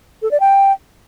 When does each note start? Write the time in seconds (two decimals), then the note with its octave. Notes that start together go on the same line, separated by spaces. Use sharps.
0.22 A4
0.31 D5
0.40 G5